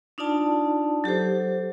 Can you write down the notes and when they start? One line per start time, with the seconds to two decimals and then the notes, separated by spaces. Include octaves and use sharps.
0.18 D4 D#4 F4 D5 A5
1.04 F#3 G4 A4 C5